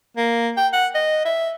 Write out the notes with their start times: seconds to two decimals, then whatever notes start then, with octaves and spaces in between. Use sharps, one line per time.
0.17 A#3
0.57 G5
0.73 F#5
0.95 D#5
1.25 E5